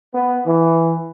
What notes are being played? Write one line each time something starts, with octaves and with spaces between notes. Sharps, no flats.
B3
E3